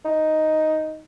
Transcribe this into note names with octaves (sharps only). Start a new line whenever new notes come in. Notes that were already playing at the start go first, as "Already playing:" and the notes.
D#4